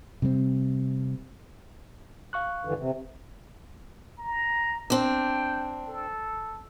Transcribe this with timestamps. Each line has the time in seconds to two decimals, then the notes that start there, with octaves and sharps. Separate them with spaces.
0.22 C3 G3 G#3 C4
2.33 F5 C#6 F#6
2.65 G2 D3 E3
2.79 C3
4.18 A#5
4.90 C4 D4 G5
5.88 A4